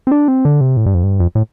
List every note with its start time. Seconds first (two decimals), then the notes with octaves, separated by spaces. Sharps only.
0.07 C4
0.11 D4
0.28 C4
0.45 D3
0.61 C3
0.77 A2
0.86 G2
0.94 F2
1.03 G2
1.20 F2
1.35 A2